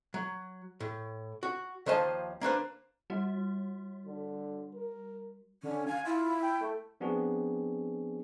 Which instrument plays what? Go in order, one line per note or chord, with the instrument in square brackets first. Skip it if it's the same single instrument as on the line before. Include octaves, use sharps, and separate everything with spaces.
[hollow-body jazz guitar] F#3
A2
F#4
D#2 F3 C5 D#5 A5
A#3 D4 B4 C5
[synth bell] G3 F#4
[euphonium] D3
A#4
[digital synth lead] D3 [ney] C#4
[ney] F5 [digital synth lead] G#5
[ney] E4 [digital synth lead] F4
[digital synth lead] G5
A3
[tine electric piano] F3 B3 C4 D4 F#4 G#4